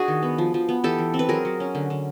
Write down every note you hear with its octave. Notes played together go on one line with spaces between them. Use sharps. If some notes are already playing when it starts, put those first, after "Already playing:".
Already playing: D4 F#4 G#4
D#3
B3
F3
F3
B3
E3 G4 A4
E3
C4
B4
F#3 G#4 A#4
F#3
C#4
D3
D3